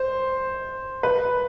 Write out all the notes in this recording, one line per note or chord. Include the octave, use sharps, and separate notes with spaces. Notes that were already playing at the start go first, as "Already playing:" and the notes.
Already playing: C5
B4